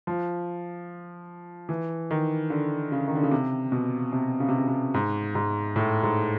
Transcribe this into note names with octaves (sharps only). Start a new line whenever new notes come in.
F3
E3
D#3
D3
C#3
D#3
D3
C#3
C3
B2
C3
C#3
C3
C#3
C3
G#2
G#2
A2
G#2